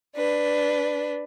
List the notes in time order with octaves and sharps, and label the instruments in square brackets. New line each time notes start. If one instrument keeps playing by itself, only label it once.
[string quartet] D4 B4